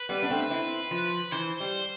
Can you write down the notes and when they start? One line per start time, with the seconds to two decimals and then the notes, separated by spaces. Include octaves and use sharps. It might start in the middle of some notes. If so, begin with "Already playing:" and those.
Already playing: B4
0.09 G3 B3
0.23 D4
0.30 A3 C4
0.50 C4 E4
0.91 F3
1.32 E3 C5
1.60 G3